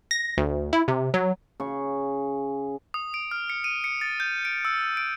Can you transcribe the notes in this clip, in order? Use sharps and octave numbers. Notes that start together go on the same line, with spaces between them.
A#6
D2
E4
C3
F#3
C#3 C#6
D#6
D7
F6
C#7
D#7
C#7
A6
G6
D7
E6
D7